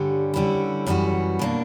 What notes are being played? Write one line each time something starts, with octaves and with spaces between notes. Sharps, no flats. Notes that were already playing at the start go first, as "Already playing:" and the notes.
Already playing: G2 D3 G3 C#4
D3 G3 C#4 E4
F#2 E3 G3 C#4 F#4
B2 A#3 D4